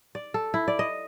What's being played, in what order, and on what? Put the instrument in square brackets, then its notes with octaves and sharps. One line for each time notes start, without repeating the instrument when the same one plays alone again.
[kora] D5
A4
E4
D5
D#5